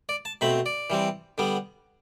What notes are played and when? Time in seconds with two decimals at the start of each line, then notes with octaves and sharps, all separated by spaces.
0.09 D5
0.25 A5
0.41 B2 A3 C4 B5
0.66 D5
0.90 E3 G3 C4
1.38 D3 G3 B3